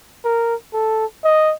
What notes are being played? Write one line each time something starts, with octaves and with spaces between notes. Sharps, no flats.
A#4
A4
D#5